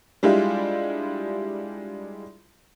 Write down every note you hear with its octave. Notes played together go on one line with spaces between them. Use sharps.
G3 G#3 D4 E4 F4 G4